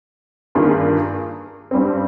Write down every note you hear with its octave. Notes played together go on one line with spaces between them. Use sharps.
G2 D#3 A#3 F4 G#4
G2 G3 C4